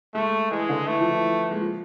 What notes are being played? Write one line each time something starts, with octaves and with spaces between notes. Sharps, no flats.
G#3 A3
E3 G#3
D3
E3 A3
F3
E3
G#3
F3